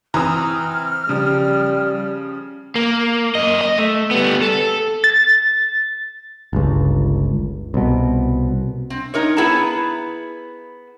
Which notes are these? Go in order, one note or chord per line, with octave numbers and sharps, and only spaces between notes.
E3 C4 A#5 D#6 F6
C#3 F3 G3
A#3
F#2 D#5
D#5
A3
G3 B3
A4
A6
G1 C#2
C2 B2
C4
D#4 A#4 C#5
B3 E4 G#4 A5 A#5